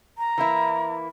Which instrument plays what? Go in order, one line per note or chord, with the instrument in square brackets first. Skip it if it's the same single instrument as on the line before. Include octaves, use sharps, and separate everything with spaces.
[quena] A#5
[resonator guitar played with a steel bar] E3 A#3 E4